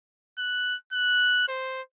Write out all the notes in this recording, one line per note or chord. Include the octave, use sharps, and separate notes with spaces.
F#6
F#6
C5